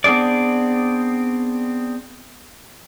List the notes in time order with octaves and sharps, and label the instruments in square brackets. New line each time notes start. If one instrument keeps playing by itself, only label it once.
[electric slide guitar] B3 C4 D4 G#4 D5